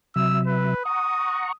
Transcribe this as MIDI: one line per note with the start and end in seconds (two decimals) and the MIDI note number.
0.16 0.74 48
0.16 0.74 54
0.16 0.74 76
0.16 0.40 88
0.47 0.85 71
0.85 1.52 78
0.85 1.52 82
0.85 1.52 85
0.85 1.54 87